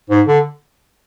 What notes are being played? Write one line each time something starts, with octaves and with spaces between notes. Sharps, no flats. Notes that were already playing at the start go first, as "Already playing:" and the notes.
G#2
D3